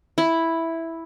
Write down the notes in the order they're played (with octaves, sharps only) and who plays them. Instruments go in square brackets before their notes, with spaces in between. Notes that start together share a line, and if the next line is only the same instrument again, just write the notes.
[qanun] E4